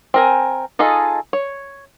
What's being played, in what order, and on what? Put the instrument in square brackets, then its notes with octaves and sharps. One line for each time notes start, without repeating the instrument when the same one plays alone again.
[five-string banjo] C4 A#4 G#5
D#4 F4 G#4 A4 D#5
C#5